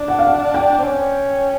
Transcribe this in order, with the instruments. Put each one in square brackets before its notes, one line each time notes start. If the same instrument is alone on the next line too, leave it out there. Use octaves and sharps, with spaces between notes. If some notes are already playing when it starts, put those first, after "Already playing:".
Already playing: [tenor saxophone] D4
[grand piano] F#5
F5
F#5
G5
[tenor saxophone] C4
C#4